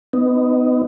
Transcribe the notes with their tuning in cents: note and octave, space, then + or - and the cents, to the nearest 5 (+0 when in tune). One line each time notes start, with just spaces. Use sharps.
B3 +30 D#4 +0